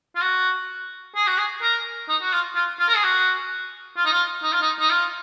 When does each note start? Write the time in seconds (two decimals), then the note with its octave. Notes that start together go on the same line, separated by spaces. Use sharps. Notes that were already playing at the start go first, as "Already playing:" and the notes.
0.16 F4
0.22 F#4
1.15 G#4
1.27 F#4
1.38 G#4
1.62 A#4
2.09 D#4
2.22 F#4
2.33 F4
2.56 F4
2.80 F4
2.88 A#4
2.95 G#4
3.03 F#4
3.97 F4
4.05 D#4
4.13 F4
4.43 D#4
4.52 F4
4.61 D#4
4.80 D#4
4.90 F4